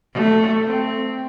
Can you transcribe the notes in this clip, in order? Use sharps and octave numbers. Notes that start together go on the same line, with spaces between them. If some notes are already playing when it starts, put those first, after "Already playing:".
A3
C4